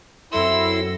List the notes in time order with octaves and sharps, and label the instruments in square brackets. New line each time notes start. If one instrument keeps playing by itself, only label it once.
[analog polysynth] F#2 F#3 A#6 [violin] C4 E6 [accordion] E4 C6 [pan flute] A4